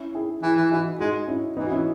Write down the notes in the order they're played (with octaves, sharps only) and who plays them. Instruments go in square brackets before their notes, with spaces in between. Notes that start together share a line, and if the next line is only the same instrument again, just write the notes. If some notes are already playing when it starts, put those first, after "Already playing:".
Already playing: [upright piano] C#4 E4
E4 G#4
[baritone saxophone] E3 [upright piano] E4 G#4
[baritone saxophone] E3
[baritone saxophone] E3 [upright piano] D#4 F#4
[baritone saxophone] G#3 [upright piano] D#4 F#4
[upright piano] C#4 E4
[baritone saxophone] E3 [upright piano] B3 D#4
[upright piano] F#4
C#4 E4